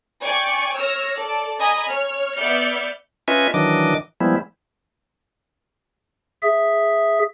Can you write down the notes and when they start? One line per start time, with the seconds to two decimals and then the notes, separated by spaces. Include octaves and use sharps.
0.25 D5 G5 G#5 C#6
0.76 C#5 E6 F6 A#6
1.17 A4 D5
1.59 D#5 G#5 A#5 B5 D#6
1.88 C#5 F6
2.38 B3 D5 E5 F6 G6 C#7
3.28 C#4 F4 B4 D#5 E5 G#5
3.54 D#3 E3 F#3 D4 D#5 D6
4.21 F3 G3 G#3 B3 E4
6.43 G#4 E5